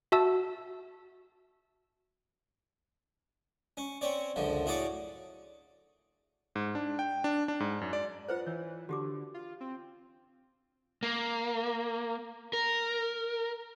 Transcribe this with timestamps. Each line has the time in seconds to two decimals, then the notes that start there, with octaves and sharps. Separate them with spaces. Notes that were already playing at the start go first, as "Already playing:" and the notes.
0.12 F#4 E5 A5 E6
3.77 C#4
4.01 C4 C#4 C#5 D5
4.36 C#2 F#2 D3 F3
4.66 A2 F#4 G#4 C#5 D5 D6
6.55 G#2
6.75 D4
6.99 G5
7.24 D4
7.48 D4
7.60 G#2
7.81 F#2
7.93 D5
8.28 F4 B4 C5 F#5
8.46 E3 C#5
8.89 D3 F#4 G4 D6
9.34 F4
9.61 C4
11.03 A#3
12.53 A#4